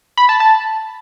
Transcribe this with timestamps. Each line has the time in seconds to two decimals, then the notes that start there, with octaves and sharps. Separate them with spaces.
0.17 B5
0.29 A5
0.40 A5